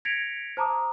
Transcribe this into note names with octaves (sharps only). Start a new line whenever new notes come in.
G#6 A#6 B6 C#7 D7 F7
C5 A5 A#5 D6 D#6